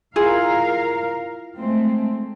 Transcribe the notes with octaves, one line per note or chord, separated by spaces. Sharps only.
E4 F4 G#4 A#4 F5
G#3 A3 C4